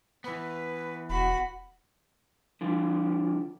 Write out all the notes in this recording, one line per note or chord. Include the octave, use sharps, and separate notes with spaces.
E3 B3 B4
E1 F#4 B5
D3 F3